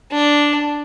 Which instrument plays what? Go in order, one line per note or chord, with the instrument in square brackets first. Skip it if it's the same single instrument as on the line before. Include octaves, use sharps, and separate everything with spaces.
[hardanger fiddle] D4